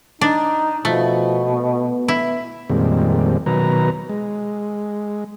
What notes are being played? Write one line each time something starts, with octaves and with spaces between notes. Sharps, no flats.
D4 D#4
B2 F3 A3
B3
E4
F2 A#2 D#3 G3 G#3 C4
B2 D#3 F#3 B4 A#5
G#3